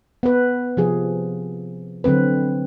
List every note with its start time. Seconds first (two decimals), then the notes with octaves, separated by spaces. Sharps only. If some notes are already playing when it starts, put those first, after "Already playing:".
0.23 B3 B4
0.77 C3 F3 G#4
2.04 D3 F#3 C4 B4